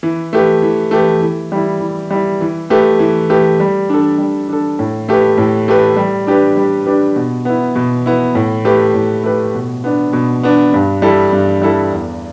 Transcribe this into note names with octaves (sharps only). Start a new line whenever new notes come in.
E3
A3 G4 B4
E3
A3 G4 B4
E3
G3 E4
E3
G3 E4
E3
A3 G4 B4
E3
A3 G4 B4
G3
D4 A4
G3
D4 A4
A2
A3 G4 B4
A2
A3 G4 B4
G3
D4 G4 B4
G3
D4 G4 B4
B2
B3 E4
B2
B3 E4
A2
A3 G4 B4
A2
A3 G4 B4
B2
B3 D4
B2
B3 D4
G2
G3 E4 A4
G2
G3 E4 A4
E2